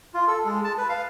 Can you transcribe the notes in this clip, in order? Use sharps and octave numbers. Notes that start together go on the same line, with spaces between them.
F4
A4
G#3
A5
B4
F5